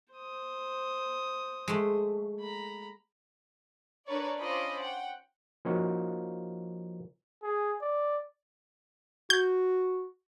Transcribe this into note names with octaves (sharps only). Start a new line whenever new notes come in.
C5 D#6
G#3 A3
A#5 B5
D4 A#4 B4 C#5 D5
C#4 F4 C5 D#5 B5 D6
F#5 G5
F3 A#3 C#4 D#4 F#4
G#4
D5
F#4 G6